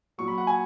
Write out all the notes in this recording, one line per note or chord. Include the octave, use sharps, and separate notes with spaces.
A#2 F#3 C#6
B5
F#5
G#5